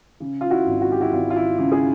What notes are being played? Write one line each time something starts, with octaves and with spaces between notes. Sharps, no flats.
C#3
F4
E4 F#4
G#1
F#4
G4
E4 F#4
G#1 F4
F4
E4
C#3
G#4